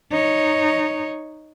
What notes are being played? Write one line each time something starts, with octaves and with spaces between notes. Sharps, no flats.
D#4 C#5